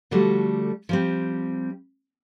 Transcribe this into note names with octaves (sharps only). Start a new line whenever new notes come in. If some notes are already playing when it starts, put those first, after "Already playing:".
D3 F3 G3 A3 F#4
F3 G3 C4